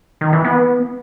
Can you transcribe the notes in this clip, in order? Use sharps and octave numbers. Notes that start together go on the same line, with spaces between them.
D#3
E3
B3